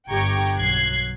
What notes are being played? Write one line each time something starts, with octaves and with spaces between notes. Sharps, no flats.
G1 G4 G5 A#5 C#6 G#6
B1 F#3 F#6 G#6 C7